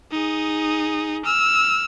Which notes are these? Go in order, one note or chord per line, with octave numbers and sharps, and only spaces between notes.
D#4 G#4
E6 F6